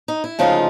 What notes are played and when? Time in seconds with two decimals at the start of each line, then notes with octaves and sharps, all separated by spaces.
0.08 D#4
0.24 E4
0.39 D2 C#3 F3 G#3 D#4 F4